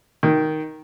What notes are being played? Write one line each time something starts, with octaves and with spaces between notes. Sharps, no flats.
D#3